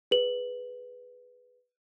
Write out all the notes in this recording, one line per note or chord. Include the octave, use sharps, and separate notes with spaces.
G#4 B4 F#7